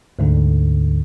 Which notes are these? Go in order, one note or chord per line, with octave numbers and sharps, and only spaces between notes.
D2 G#2 D3